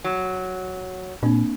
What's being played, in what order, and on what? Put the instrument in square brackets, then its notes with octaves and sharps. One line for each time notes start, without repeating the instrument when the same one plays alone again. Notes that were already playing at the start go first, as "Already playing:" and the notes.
[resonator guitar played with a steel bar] F#3
[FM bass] A#2 [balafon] A#3 C4 D4